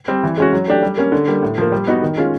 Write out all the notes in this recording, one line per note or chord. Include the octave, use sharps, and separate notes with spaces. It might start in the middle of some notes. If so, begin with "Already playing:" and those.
G3 C4
E3
G#3 C#4 F#4
F#3
A3 D4 G4
G3
A#3 C#4
D3
G3 A#3
A2
F3 A#3
G3
B3 D#4 F#4
D#3
G#3 C#4 F4